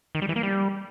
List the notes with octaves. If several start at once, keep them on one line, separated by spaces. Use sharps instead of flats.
D#3
G3
E3
A#3
G3